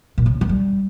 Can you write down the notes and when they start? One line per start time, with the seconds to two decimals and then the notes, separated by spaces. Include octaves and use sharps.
0.18 A#2
0.26 C#3
0.41 E3
0.49 G3